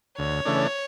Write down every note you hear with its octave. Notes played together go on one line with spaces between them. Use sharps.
D2 C#5
C#3 E3 A3 D4